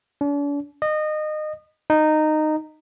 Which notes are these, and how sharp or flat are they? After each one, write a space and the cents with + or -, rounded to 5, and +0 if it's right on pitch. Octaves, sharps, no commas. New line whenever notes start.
D4 -45
D#5 -25
D#4 -15